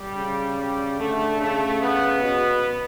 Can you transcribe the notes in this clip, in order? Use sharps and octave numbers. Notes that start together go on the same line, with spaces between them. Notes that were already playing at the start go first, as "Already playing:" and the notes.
Already playing: G3
C#3
G3
D3 A3
C#3 A3
B3
B2